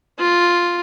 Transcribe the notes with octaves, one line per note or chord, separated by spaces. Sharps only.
F4